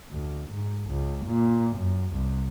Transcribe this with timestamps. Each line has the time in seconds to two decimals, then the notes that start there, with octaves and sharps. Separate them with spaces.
0.11 D2
0.51 G#2
0.90 C#2
1.27 A#2
1.77 F#2
2.15 C2